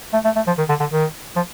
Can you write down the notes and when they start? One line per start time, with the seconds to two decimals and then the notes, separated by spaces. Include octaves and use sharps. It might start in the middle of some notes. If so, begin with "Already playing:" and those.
0.13 A3
0.25 A3
0.36 A3
0.47 F3
0.58 D#3
0.69 D3
0.80 D3
0.92 D#3
1.36 F3